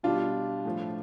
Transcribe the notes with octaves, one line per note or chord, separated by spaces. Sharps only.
B2 G3 D4 F4
A2 F3